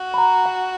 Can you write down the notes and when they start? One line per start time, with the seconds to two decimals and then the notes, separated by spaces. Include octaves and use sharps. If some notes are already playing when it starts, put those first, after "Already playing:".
Already playing: F#4
0.14 B5
0.18 A#5
0.46 F#5